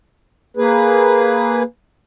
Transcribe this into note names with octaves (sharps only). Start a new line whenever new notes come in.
A#3 G#4 B4